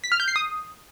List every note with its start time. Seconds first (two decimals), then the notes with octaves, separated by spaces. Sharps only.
0.04 B6
0.12 F6
0.20 G6
0.28 C7
0.36 D#6